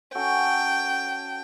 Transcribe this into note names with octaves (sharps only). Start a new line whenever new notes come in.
C#4 F#4 A4 G5